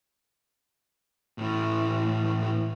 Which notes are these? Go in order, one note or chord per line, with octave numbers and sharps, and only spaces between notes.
A2 E3